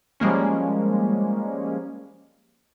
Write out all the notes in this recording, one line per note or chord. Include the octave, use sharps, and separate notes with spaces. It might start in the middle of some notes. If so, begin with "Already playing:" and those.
F3 G3 G#3 A#3 C#4